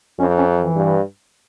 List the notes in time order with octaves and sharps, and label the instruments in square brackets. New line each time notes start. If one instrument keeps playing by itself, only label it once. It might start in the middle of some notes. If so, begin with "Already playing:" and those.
[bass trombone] F2 [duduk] C#4
[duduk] C#4
E3
[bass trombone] G2